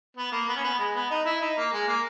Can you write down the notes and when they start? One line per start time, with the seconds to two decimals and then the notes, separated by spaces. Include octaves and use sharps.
0.16 B3
0.32 A#3
0.49 B3
0.56 C#4
0.63 B3
0.79 G#3
0.95 B3
1.10 D#4
1.25 E4
1.41 D#4
1.57 A#3
1.72 G#3
1.88 A#3